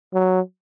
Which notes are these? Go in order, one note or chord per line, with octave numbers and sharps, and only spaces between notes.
F#3